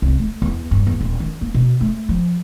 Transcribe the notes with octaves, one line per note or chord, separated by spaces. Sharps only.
C2
A3
E2
G2
E2
D#1
D#3
A#3
B2
A3
F3